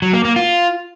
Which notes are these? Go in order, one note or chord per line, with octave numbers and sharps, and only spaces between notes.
F#3
A#3
A#3
F4